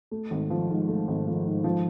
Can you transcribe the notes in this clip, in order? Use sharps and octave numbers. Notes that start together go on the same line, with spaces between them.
A3
G#1
F3
G#2
A3
G#1
F3
G#2
F3